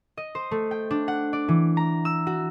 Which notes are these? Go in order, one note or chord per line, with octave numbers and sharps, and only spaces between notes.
D#5
C5
A3
G5
D4
F#5
D5
E3
A#5
E6
F#4